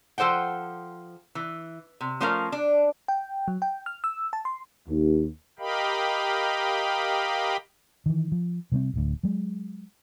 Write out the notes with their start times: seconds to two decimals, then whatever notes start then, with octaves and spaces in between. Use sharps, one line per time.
0.18 F3 A4 C5 F#5 G5
1.35 E3
2.01 C3
2.20 F3 A3 C#4 A#4 F5
2.52 D4
3.08 G5
3.48 F#3
3.62 G5
3.86 F6
4.04 E6
4.33 A5
4.45 C6
4.88 D#2
5.59 G4 A#4 D#5 F5 G5 B5
8.06 D#3 E3
8.32 F3
8.72 C3 G3 B3 C4
8.93 D1 D2
9.23 F#3 G#3